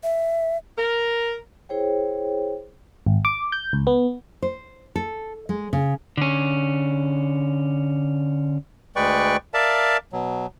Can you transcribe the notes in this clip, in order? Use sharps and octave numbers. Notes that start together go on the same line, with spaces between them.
E5
A#4
E4 G#4 C5 C#5 G5
G#1
D6
G6
C#2
B3
C5
A4
G#3
C#3
D3 C#4
D2 G#3 B4 D5 G5 C#6
A#4 D5 E5 F5 A5
B2 F#3